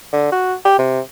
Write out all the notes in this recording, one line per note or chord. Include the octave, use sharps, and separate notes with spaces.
D3
F#4
G4
C3